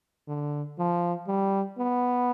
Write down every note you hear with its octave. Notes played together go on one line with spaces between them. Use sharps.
D3
F3
G3
B3